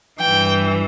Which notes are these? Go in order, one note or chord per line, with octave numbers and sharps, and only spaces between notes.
G2 E3 G5